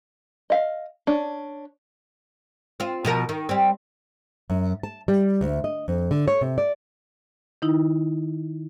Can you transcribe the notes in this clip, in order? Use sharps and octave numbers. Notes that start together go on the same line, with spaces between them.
D#5 F5
C#4 D4
C4 F4
B2 F3 A#4
D#3
G3 C4
F#2
A5
G3
D2
D#5
F2
D3
C#5
C3
D5
D#3 D#4 E4